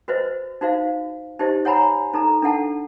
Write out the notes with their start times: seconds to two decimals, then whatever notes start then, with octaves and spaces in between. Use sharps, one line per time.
0.08 F#4 B4 C5 D#5
0.61 D#4 F#4 C5 F5
1.39 D#4 G4 C5 D#5
1.65 C#5 F#5 G#5 A#5 B5
2.14 D#4 A4 A#5
2.42 D4 A4 F#5 A5